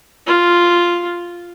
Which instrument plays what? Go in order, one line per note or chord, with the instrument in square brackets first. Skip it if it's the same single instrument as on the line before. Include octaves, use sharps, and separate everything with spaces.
[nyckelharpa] F4